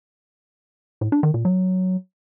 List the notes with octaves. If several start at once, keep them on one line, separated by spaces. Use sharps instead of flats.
A2
D4
D#3
A#2
F#3